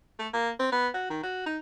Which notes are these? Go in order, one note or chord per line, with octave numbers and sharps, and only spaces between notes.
A3
A#3
C4
B3
F#4
D#3
F#4
D#4